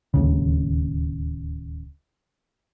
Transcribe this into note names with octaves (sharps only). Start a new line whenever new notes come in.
D1 D#2 C#3